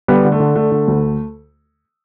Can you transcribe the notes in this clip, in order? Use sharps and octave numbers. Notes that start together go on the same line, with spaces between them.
D3 G3 B3
D3
A3
D3
D3 A3
D3
D2